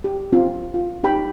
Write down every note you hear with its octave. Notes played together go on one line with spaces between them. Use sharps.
G4
C4 F4
F4
D#4 G4 G5 B5